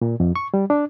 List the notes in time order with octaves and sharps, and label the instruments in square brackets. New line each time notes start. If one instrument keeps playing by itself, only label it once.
[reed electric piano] A#2
F2
C#6
G3
D4